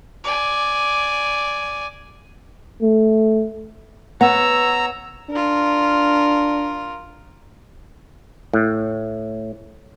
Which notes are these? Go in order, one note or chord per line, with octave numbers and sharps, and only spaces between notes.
D5 G#5
A3
B3 C#5 F#5 A#5 E6
D4 F4 A#4
A2